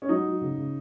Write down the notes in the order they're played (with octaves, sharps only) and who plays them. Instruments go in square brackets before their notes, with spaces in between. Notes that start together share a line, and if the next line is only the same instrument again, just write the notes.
[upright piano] C#4
F#3 D#4
F#3
C#3
C#3